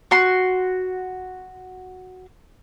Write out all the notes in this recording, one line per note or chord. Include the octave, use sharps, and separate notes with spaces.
F#4 C6